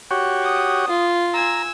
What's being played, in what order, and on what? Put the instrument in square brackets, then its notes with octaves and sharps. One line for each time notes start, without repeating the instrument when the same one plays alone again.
[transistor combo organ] F#4 G4 C#5
[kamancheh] D#6
[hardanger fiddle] F4
[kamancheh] G#5 E6 [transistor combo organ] A#5